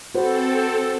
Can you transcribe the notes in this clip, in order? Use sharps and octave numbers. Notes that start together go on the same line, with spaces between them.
C4 F#4 A4 B4 C5